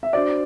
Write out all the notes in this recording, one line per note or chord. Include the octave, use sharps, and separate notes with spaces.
E5
D4 F#4 C5 D5